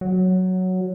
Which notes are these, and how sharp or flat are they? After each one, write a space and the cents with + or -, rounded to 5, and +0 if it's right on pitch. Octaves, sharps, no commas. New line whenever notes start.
F#3 +0